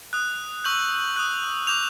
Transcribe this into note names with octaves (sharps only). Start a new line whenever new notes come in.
D#6 F#6
C#6 E6 G6 F#7
D#6 F#6
D6 G6 F7